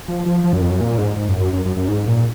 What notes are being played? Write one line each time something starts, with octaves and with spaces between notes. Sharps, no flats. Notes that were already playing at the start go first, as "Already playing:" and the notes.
F3
F3
F3
F#2
F2
F#2
A#2
G#2
G#2
F#2
F#2
F#2
F#2
F#2
G#2
A#2